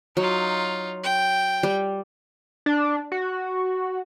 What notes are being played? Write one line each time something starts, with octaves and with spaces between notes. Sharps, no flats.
F#3 D#4 F4
G5
G3
D4
F#4